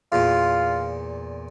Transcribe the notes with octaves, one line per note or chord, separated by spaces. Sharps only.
E2 A#2 F4